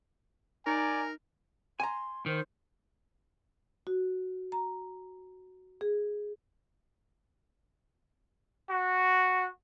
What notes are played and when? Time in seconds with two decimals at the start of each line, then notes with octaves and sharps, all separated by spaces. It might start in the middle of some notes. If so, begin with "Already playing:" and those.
0.66 D#4 A#4 D5 G#5
1.80 G#5 A#5 C6
2.26 D#3 C5
3.87 F#4
4.52 A#5
5.81 G#4
8.70 F#4